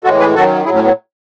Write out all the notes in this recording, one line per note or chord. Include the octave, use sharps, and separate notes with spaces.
A2 E3 G#3 F#4 A4
G#4 B4
F#2 D#3 F#3 F#4 A4
A2 F#3 E4 G#4
A3 C#4
B3